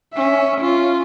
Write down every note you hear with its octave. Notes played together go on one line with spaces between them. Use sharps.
C#4 E5
C#4 F4